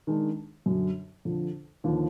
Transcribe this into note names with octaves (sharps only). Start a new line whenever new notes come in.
D#3 G#3 D4
F#2 D3 F#3
F2 D3 F3
D#2 D3 F3